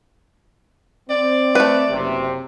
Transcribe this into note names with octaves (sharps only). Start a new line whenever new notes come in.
C4 D5
A3 B4
F#1 C3